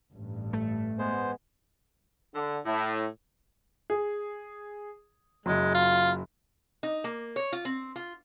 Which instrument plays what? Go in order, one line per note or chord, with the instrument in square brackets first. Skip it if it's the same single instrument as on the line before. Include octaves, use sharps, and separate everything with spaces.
[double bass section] A1 G2
[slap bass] A3
[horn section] G#3 B3 [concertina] C5
[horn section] D3
A2
[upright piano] G#4
[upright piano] F#1 F#3 [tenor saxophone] G#3
[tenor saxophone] F4
[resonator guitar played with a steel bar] D#4
A#3
C#5
F4
C4
F4